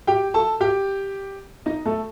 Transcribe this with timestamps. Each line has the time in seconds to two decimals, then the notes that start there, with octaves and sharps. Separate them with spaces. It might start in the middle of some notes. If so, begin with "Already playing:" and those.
0.07 G4 G5
0.34 A4 A5
0.61 G4 G5
1.66 D#4 D#5
1.85 A3 A4